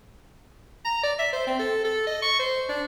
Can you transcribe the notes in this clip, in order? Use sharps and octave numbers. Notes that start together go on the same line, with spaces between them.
A#5
D5
E5
C5
C4
A4
A4
D#5
C#6
C5
D4